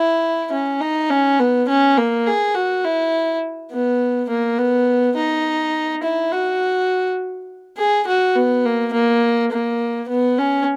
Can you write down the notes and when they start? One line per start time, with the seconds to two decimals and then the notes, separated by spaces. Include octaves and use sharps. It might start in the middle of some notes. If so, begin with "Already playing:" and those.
Already playing: E4
0.52 C#4
0.81 D#4
1.10 C#4
1.39 B3
1.69 C#4
1.97 A#3
2.26 G#4
2.55 F#4
2.84 E4
3.71 B3
4.29 A#3
4.58 B3
5.16 D#4
6.03 E4
6.32 F#4
7.77 G#4
8.07 F#4
8.36 B3
8.65 A#3
8.93 A#3
9.52 A#3
10.09 B3
10.38 C#4